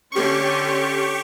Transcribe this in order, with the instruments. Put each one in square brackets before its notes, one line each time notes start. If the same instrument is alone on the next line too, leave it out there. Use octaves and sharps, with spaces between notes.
[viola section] D3 C#4 C6 [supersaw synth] G4 C#6